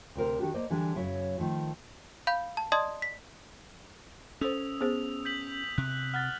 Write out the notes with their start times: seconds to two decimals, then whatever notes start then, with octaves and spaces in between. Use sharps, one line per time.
0.15 D2 C3 A#4 C5
0.39 D#3 D4 F#4 G4
0.54 A#3 C5 D5 D#5
0.70 D3 E3 G3 G#3 D4 G#4
0.96 F#2 C#3 F#3 E4
1.38 D#3 F3 A3
2.27 F5 B5 G6
2.57 A5
2.72 D5 D#5 A5 C6 D#6 G#6
3.02 B6
4.41 C#4 A4 C5 D#6 E6 F7
4.81 B3 G#4 C5
5.25 G6 B6 F#7
5.78 C3 F#6
6.14 F#5 F6 F#6 A6